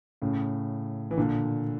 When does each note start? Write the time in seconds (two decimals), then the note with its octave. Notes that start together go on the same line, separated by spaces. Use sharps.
0.22 A2 C#3
1.11 E3
1.17 A#2 D3